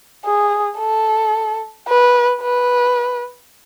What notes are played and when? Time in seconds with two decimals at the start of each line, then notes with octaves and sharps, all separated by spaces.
0.25 G#4
0.79 A4
1.88 B4
2.42 B4